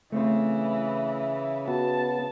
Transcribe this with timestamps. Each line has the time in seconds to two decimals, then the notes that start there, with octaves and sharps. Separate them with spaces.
0.12 C#3 E3 A3 C4 C5
1.68 B3 F#4 A5